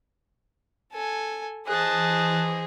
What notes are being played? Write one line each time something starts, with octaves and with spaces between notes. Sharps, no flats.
A4 G#5
E3 G#4 C5 D#5 A5 F#6